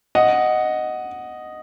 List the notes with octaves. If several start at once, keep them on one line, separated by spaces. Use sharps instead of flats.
D#5 F#5